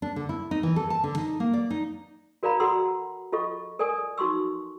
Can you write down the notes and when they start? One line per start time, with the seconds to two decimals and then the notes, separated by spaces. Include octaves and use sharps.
0.02 D4
0.16 D3
0.29 E4
0.51 D#4
0.63 E3
0.76 A4
0.90 A5
1.04 D3
1.17 D#4
1.40 A#3
1.54 D5
1.70 D#4
2.43 F#4 A#4 D5 F5 A#5 B5
2.60 F#4 A4 F#5 A#5 C6 E6
3.32 F4 A4 D#5 C#6
3.79 A4 A#4 D5 G#5 D#6
4.18 D#4 F#4 C6 C#6 E6